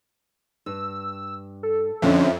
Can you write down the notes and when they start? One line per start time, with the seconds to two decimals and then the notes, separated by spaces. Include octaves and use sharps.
0.66 G2 E6
1.63 A4
2.02 F2 D3 C#4 D4 E5